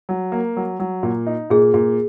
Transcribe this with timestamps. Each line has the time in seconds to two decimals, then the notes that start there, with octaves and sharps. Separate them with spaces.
0.09 F#3
0.32 A#3
0.57 F#3
0.79 F#3
1.03 A#2
1.27 D#4
1.50 A#2 G#4
1.74 A#2